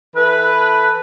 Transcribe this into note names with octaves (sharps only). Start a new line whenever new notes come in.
E3 A4 B4